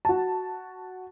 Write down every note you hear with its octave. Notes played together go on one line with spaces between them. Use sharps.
F#4 A5